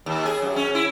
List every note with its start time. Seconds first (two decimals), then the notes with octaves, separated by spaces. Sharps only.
0.06 D#2
0.25 G#4
0.42 F#2
0.56 C#4
0.75 E4